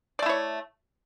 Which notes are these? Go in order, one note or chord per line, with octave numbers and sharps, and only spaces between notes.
A3 E4 C#5 D5